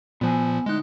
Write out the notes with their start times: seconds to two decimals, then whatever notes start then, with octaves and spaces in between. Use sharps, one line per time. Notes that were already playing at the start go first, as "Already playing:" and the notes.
0.21 A#2 F3 B3 G#5
0.66 D2 G#3 D#4 F#6